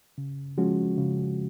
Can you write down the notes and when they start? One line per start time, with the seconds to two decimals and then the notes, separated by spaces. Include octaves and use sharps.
0.18 C#3
0.58 F3 G#3 C#4 F#4
0.98 C#3